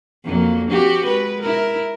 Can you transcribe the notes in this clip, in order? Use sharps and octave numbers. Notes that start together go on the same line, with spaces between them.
F2 F#3 A#3
C4 F#4 G4
G#3 B4
E4 A#4